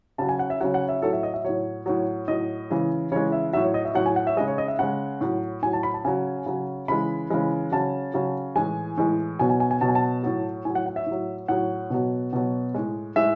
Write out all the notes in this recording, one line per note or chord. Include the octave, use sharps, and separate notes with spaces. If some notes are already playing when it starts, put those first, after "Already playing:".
C#3 F#3 A5
G#5
F#5
E5
C#3 F#3 F#5
F#5
E5
A2 F#3 A4
E5
D#5
E5
A2 F#3 C#5
A2 F#3
A2 F#3 D#5
C#3 E3 G#3
C#3 E3 G#3 C#5
E5
A2 F#3 E5
C#5
D#5
E5
A2 F#3 F#5
G#5
F#5
E5
C#3 G#3 D#5
C#5
D#5
E5
C#3 G#3 F#5
A2 F#3
A2 F#3 G#5
A5
B5
A5
C#3 F#3 G#5
C#3 F#3
C#3 E3 G#3 B5
C#3 E3 G#3
C#3 F#3 A5
C#3 F#3
A2 E3 G#3 G#5
A2 E3 G#3
B2 F#3 G#5
G#5
G#5
G#5
B2 F#3 A5
G#5
A5
A2 F#3
A2 F#3 G#5
F#5
F#5
E5
A2 F#3
A2 F#3 F#5
B2 F#3
B2 F#3
A2 G#3
A2 G#3 E5